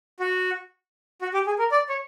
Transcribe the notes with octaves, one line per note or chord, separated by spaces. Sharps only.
F#4
F#4
G4
G#4
A#4
D5
C#5